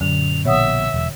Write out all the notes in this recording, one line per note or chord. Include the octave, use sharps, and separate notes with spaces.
F#2 A#2 D3 F7
A#1 B2 C#5 E5 F#5 D#6
E1